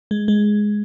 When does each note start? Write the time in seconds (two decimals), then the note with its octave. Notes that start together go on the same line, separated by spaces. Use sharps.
0.11 G#3
0.28 G#3